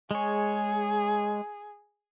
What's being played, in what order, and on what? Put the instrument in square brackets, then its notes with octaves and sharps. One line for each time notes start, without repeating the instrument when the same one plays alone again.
[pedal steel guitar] G#3 C#5 [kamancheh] G#4